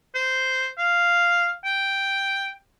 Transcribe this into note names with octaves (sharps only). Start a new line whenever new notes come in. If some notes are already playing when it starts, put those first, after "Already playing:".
C5
F5
G5